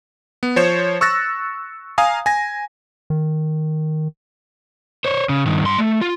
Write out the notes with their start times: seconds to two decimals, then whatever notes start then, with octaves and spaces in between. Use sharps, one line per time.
0.43 B3
0.56 F3 C5 C#5 E7
1.01 C#6 E6 F#6 A6 A#6
1.98 F5 G#5 A#5 D#6
2.26 G#5 A#6
3.10 D#3
5.05 C5 C#5
5.29 C#3
5.46 G2 D#3
5.63 G2 C6
5.78 A3
6.02 F4